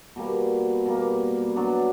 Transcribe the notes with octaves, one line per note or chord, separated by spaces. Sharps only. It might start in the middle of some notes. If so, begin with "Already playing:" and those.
B2 G3 A#3
B2 G3 A#3
F#3 B3 D4